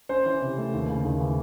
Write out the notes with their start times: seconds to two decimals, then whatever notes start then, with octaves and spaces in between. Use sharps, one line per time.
0.09 C#4 C5
0.26 E3
0.41 C3
0.58 A3
0.73 D#2
0.89 C#3
1.04 D#2
1.21 E3